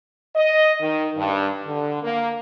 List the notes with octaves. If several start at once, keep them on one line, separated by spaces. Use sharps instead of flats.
D#5
D#3
G2
D3
A#3